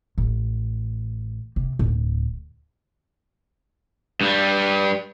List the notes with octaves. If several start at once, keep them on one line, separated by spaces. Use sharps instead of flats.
A1
C3
D1
G2 G3